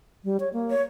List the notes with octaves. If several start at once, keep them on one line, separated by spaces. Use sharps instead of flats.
G3
C#5
A#3
C#5